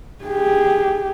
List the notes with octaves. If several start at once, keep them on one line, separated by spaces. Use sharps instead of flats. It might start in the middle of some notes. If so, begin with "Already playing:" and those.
G4 G#4